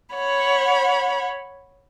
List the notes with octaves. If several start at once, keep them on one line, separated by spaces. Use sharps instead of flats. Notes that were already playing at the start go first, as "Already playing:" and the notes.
C#5 F#5 B5